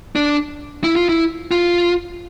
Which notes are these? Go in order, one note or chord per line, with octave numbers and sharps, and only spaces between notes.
D4
E4
F4
E4
F4